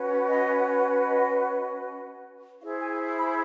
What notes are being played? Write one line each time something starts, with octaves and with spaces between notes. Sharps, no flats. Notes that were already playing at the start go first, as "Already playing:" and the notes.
Already playing: C#4 F#4 B4
D#5
D#5
E4 G#4 C5 F5
G#5
B5